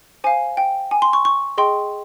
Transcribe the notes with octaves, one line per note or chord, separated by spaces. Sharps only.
C5 F5 G#5
G5
G#5
C6
C#6
C#6
G#4 D#5 G5 C6